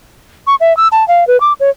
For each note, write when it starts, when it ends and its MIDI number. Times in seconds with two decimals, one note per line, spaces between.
0.47 0.55 85
0.60 0.75 76
0.77 0.88 88
0.92 1.06 81
1.08 1.27 77
1.27 1.40 71
1.40 1.53 86
1.60 1.70 73